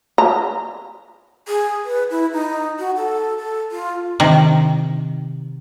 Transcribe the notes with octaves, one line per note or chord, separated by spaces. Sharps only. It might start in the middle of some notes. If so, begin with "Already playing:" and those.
A#5
G#4
B4
E4
D#4
F#4
A4
A4
F4
C3 D#3